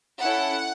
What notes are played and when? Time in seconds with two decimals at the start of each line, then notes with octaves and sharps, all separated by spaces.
0.21 C#4 E4 A4 F#5